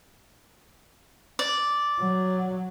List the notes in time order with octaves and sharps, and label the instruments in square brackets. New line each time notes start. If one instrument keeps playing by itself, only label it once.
[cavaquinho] D5
[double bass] F#3